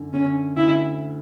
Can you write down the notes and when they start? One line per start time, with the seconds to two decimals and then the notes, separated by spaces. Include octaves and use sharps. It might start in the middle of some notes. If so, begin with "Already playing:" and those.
Already playing: F#2 D3
0.13 D3 C#4
0.56 D2 E4